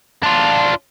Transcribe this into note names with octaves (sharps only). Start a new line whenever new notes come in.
D4 F4